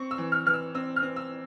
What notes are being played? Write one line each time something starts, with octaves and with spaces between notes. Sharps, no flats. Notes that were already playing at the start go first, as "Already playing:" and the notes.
Already playing: C4 C#6
E6
E3
F6
E3 F6
E6
C4 E6
F6
C4
E6